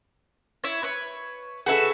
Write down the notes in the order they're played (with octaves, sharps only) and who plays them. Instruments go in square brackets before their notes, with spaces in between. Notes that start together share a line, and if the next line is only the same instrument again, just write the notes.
[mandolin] E4 C#5
B4 C#5
[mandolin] F#4 B4 E5 [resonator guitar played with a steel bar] G#4 A4